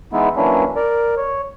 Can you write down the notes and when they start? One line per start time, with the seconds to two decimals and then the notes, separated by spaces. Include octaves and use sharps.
0.13 E3 G#3 B3 D#4 E4
0.37 E3 F#3 A#3 C#4 D4 E4
0.76 A#4 D5
1.17 C#5